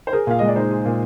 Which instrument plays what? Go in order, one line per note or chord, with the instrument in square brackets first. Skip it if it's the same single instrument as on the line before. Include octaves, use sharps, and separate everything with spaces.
[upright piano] C5
[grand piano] G#4 [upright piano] A#4
[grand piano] A#2 [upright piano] F5
[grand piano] G#3 [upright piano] D#5
[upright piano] D5
[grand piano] D#4 [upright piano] C5
[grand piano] G#4
A#2